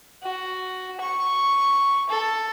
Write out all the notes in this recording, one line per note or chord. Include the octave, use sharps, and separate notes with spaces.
F#4
C#6
A4